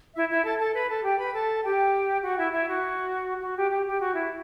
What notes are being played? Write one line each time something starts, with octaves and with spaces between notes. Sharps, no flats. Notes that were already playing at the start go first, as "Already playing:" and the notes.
E4 E5
E4 E5
A4 A5
A4 A5
B4 B5
A4 A5
G4 G5
B4 B5
A4 A5
G4 G5
F#4 F#5
E4 E5
E4 E5
F#4
F#4
G4
G4
G4
F#4
E4